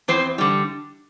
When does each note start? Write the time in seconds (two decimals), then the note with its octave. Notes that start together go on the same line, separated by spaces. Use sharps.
0.08 E2 C4 C5
0.38 D3 G3